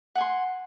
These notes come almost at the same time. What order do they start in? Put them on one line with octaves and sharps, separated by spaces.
F#5 G#5 C6